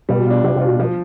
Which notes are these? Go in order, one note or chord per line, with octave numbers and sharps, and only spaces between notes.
B2 G3
D4 F4
C3 G3
C3
D4 F4
B2
B2 F3